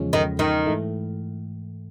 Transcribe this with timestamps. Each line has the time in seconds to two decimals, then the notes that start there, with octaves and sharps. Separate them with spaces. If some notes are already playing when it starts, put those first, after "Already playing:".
Already playing: E2 C#3 F3 G#3 C#4
0.13 D#3
0.39 D#3
0.66 G#2 E3 A3